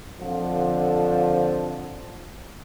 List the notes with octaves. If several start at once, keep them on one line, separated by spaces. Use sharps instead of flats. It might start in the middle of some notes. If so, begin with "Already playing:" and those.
F2 D3 F3